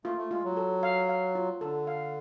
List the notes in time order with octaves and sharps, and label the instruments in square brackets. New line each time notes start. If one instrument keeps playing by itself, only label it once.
[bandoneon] A3 [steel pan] F4
[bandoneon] A3
[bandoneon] G#3 [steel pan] F4
[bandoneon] F#3
[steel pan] A4
F5
F5
F4
[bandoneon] D3 [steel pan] A4
[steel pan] F5